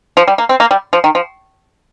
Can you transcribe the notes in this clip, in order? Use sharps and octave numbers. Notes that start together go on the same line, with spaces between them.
F3
G3
A#3
C4
A#3
G3
F3
D#3
F3